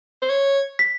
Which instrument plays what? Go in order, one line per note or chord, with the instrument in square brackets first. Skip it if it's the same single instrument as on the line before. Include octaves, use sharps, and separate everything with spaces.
[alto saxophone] C5
C#5
[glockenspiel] B6